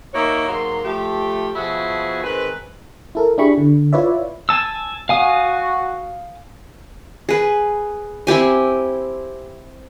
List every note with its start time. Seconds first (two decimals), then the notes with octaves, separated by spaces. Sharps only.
0.14 A#3 D#4 F#4 C#5 E5
0.48 G#2 F#3 A#3 C6
0.84 F3 A3 G4
1.55 B2 F3 E4 F#4 G#4
2.22 D#3 G#3 C4 B4
3.15 E4 A4 A#4
3.38 D4 E4 G4 G#4 B5 C#6
3.58 D3
3.93 E4 F4 B4 C#5 D5 E5
4.49 G#5 A5 E6
5.09 F#4 F5 G#5 D#6
7.29 G#4 B4
8.27 C4 E4 G4 G#5